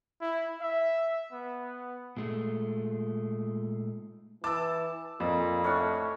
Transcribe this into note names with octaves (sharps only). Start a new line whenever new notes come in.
E4
E5
B3
A#2 G#3 A3
E3 A5 D6 E6
F2 A#2
A2 C#4 D4 C#5